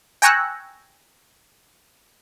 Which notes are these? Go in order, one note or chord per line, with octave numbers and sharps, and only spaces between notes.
G5 G#5 A#5 C#6 E6 F#6